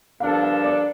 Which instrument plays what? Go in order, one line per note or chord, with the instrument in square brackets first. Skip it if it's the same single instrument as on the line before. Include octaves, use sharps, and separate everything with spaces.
[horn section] G2 F3 A#3 D4 A4 [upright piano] F5
[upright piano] F5
D5